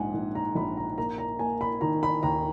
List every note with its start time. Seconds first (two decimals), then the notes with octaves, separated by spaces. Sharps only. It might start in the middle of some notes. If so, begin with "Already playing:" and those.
Already playing: A#1 G#2 F#5 G#5
0.14 A#1
0.35 A#5
0.55 A#1 B5
0.77 A#5
0.98 A#3 A#5
1.18 A#5
1.39 A#3 G#5
1.61 B5
1.81 D#3 A#5
2.03 B5
2.23 D#2 A#5